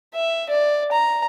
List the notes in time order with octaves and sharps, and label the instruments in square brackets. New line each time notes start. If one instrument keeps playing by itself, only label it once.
[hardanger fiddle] E5
D5
A#5